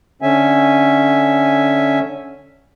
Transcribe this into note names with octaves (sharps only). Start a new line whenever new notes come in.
D3 C#4 E5 G#5